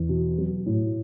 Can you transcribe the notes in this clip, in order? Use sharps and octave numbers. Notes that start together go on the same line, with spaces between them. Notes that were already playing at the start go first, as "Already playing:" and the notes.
Already playing: E2
B2
F#3
A2